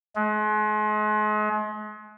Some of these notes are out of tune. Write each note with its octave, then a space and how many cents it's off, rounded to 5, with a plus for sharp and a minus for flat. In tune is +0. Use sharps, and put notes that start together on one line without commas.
G#3 +40